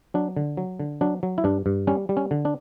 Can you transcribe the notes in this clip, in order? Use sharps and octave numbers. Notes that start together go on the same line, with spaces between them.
F#3 D4
D3
F#3
D3
F#3 D4
F#3
E4
G2 D4
G2
G3 C#4
G3
C#4
D3
D4